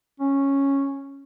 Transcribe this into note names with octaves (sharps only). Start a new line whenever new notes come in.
C#4